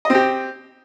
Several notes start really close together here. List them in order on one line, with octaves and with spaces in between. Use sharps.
D#5 C4 G4